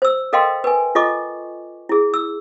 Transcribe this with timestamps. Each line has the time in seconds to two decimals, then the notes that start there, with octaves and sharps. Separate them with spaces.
0.02 C5 E6
0.33 A4 A#4 D#5 F5 G5 C6
0.64 B4 G#5
0.95 F4 A4 D#5 C#6 D6
1.89 E4 G#4
2.14 E6